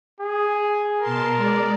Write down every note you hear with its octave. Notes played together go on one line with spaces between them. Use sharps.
G#4
B2 A#4 A5 C6
G#3 D5